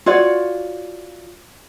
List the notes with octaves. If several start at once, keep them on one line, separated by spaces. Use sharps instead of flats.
F4 F#4 C#5 D5